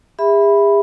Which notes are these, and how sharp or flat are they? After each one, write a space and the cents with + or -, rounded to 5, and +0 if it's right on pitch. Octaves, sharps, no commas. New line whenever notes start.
G#4 -45 E5 +0 B5 +0